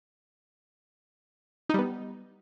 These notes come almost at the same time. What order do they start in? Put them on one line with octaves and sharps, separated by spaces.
D#4 G3 B3